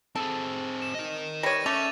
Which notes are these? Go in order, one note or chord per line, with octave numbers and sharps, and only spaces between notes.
C4 G#4 A4
E7
A#4 D#5
G3 C#5 A#6 D#7
A3 C#4 D6 A6 F7